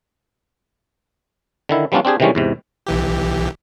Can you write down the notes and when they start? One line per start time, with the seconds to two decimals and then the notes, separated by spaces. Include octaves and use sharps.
1.69 D3 D#3 E4
1.92 F3 G3 B3 C#4 D4 F4
2.05 C4 D4 G4 G#4
2.20 C3 D#3 E3 G3 G#3 C#4
2.35 E2 G#2 C3
2.86 B1 E3 G4